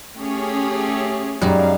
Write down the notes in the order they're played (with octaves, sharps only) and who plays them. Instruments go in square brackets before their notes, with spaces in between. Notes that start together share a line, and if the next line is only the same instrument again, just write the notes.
[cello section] A3 G4 G#4 [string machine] C#4 C#5
[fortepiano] F#2 [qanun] G3 G#3 D#4 [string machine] F5